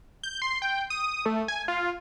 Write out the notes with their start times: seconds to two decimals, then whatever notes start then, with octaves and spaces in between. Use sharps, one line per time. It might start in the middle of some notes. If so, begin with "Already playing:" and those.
0.23 G6
0.42 C6
0.62 G5
0.90 D#6
1.26 A3
1.48 G#5
1.68 F4